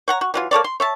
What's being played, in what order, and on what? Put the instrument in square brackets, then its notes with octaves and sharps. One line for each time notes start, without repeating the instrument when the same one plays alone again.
[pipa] C#5 F#5 A#5
F#4
E3 F#3 F4
A#3 A4 C#5 D5
C6
C#5 E5 A5